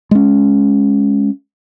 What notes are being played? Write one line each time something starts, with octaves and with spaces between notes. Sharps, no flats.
G#3 C#4